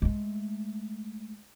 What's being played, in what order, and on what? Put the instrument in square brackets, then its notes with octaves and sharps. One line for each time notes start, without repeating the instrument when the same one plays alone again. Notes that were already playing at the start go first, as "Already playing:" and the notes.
[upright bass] G#3 A3